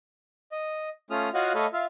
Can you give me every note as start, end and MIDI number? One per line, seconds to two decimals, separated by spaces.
0.52 0.89 75
1.11 1.29 57
1.11 1.29 61
1.11 1.29 65
1.11 1.29 87
1.11 1.29 89
1.34 1.52 65
1.34 1.52 66
1.34 1.52 73
1.34 1.52 75
1.34 1.52 77
1.34 1.52 78
1.55 1.66 57
1.55 1.66 69
1.55 1.66 73
1.55 1.66 75
1.55 1.66 77
1.55 1.66 83
1.73 1.85 65
1.73 1.85 76
1.73 1.85 77